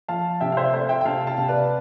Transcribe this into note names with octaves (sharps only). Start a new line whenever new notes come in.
F3 F5 A5
C3 E5 G5
F5
C5 E5
A3 C5 E5
E5 G5
G5
C3 F5 A5
F5 A5
C3
B4 D5